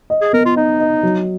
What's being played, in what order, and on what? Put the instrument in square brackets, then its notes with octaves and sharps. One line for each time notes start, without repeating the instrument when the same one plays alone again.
[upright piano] D#5
[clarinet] G#4
[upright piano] B3 [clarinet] A#4
[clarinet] F4
[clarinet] D#4 [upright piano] D#5
[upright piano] D#5
F#3